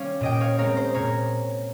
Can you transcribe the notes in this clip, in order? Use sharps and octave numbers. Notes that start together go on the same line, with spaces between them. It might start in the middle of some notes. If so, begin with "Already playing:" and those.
Already playing: G3 C#4 C#5 F5
A#2 D#5 G5
C#5 F5
G#3 C4 A#4 C#5
C5
A#2 A#4 C#5